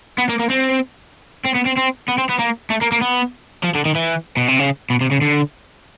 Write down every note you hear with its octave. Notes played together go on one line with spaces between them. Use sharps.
B3
A#3
A#3
C4
C4
B3
C4
C4
B3
C4
B3
A#3
A3
A#3
A#3
B3
F3
D3
D#3
E3
B2
C3
C#3
B2
C3
C#3
D3